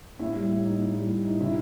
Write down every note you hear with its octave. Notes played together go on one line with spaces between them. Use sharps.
A2 E4
G3
A2
D#4
A2
G3
A2
D#4
C3 E4